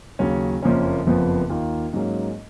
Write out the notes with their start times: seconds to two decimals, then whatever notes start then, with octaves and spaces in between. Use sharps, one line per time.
0.19 D#2 C#3 F#3 C#4
0.62 F#1 F2 F3 A#3 C#4
1.06 F#1 F2 F3 B3
1.50 D#2 D#3 A#3 F4
1.93 G#2 F#3 A#3 C#4